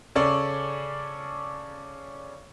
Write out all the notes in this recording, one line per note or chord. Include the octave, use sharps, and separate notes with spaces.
C#3 C#4 A4 D5